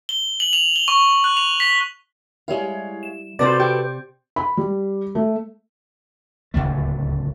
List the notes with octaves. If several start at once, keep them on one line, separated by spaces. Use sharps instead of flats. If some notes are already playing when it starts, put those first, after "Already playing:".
G7
F#7
F7
G7
C#6
F#6
F7
B6
G3 G#3 E4 C#5 F5
E7
C3 F#4 A4 B4 C5 D5 A6
G4 G5
B5
G3
A3
D1 G#1 C#2 A3